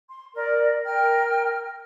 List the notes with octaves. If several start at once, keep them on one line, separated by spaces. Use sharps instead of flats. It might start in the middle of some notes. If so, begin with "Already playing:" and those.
C6
A#4 D5
A#4 G5 F6